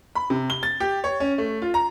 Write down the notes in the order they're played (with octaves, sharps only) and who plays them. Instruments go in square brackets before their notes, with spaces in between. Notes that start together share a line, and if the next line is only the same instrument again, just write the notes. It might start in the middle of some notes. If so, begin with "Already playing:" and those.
[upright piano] B5
C3
G7
A6
G4
C#5
C#4
A3
F4
A#5